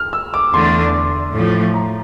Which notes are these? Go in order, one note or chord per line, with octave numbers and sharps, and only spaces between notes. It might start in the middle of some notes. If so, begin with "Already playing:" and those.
Already playing: F6
E6
D6
E2 D3 A3 D4 C6
A2 F3 A3
A#5